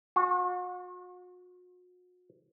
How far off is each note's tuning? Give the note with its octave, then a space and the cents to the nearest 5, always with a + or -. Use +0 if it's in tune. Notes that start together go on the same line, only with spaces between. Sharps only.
F#4 -45